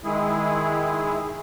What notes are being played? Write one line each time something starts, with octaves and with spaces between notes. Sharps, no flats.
D#3 G#3 E4 G#4